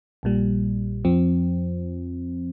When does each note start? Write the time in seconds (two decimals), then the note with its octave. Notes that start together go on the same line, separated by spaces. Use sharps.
0.23 A#1 A#2 G3
1.04 F2 F3 C4